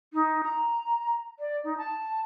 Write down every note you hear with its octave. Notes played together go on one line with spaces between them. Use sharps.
D#4
A#5
D5
D#4
A5